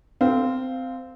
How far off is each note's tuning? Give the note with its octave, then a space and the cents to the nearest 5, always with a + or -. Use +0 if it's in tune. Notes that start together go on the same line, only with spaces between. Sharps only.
C4 -15 A4 +30 F5 +0